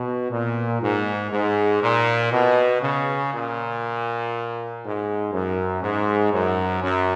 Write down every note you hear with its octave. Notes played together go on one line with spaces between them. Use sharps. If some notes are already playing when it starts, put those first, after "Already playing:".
Already playing: B2
A#2
G#2
G#2
A#2
B2
C#3
A#2
G#2
F#2
G#2
F#2
F#2